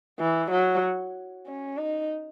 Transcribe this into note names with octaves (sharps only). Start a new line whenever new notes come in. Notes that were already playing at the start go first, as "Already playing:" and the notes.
E3
F#3
C#4
D#4